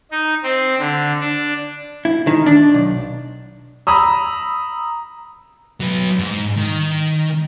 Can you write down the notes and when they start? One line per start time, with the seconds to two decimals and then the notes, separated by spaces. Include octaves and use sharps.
0.11 D#4
0.43 C4
0.79 D3
1.20 D4
2.05 E4
2.27 D#3
2.46 D4
2.74 B1
3.87 A#5 B5 D#6 E6
5.80 F#3 B4
6.19 G#2
6.57 D#3